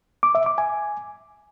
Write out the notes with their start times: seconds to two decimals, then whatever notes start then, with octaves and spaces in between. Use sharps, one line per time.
0.23 D6
0.35 E5
0.46 D6
0.58 G#5